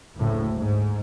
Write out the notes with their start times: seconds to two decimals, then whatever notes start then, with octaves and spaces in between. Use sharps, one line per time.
0.17 F#1 D2 A2
0.57 G#2